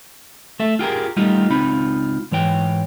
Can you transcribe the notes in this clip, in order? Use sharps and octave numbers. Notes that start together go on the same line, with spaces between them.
A3 A4 E5
F4 G4 G#4 A#4
G3 A3 D#4 F4 G4
C#2 C4 D#4 F4 B5
G#2 E3 C#5 G5